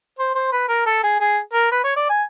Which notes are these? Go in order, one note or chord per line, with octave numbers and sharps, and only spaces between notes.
C5
C5
B4
A#4
A4
G#4
G#4
A#4
B4
C#5
D5
G#5